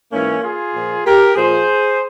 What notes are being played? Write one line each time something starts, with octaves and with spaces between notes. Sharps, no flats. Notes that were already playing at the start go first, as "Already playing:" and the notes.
G#2 E3 A#3 C#4
F4 G#4
A#2 F3
G4 A#4
A#2 F3 G#4 C5